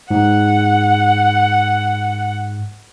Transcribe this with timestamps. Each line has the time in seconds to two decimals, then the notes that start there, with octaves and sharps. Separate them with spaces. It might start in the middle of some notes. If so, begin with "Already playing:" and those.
0.11 G#2 F#5